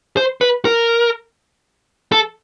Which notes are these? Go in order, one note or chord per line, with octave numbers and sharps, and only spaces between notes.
C5
B4
A#4
A4